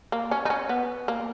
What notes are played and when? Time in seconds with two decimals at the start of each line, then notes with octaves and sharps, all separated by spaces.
0.12 A#3
0.31 C#4
0.45 D#4
0.50 C#4
0.69 B3
1.08 A#3